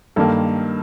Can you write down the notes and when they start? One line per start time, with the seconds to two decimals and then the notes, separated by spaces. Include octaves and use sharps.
0.16 G2 D#3 A#3 A4